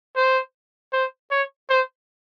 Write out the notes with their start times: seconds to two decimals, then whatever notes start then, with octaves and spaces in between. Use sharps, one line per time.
0.16 C5
0.93 C5
1.31 C#5
1.70 C5